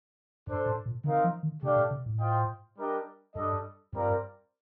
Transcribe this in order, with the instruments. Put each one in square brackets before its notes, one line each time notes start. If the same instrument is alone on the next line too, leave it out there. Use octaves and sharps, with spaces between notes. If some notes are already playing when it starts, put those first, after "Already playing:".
[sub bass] G2 [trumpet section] D4 A4 C5
[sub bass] A2
A#2
[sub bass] D3 [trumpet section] C4 D#4 A#4 F5
[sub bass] F3
D#3
[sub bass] C3 [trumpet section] A3 D4 G4 D5 F5
[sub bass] A#2
C3
A2
[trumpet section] F4 C5 D#5 G5
G3 D4 G4 A#4 D#5
[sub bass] G2 [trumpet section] G3 D4 A4 D#5
[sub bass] G2 [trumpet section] G3 C4 F4 A#4 D5